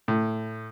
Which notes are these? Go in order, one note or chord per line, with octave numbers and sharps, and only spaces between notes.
A2